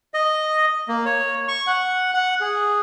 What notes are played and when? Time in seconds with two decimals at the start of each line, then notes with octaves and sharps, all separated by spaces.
0.14 D#5
0.88 A#3
1.05 C#5
1.48 C#6
1.67 F#5
2.14 F#5
2.41 G#4